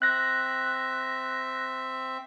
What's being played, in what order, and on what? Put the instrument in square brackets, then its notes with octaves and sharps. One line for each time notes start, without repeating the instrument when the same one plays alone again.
[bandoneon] C4 E5 [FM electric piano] F#6 A#6